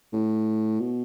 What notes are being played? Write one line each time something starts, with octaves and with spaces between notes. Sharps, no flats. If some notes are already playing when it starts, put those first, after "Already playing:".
A2
B2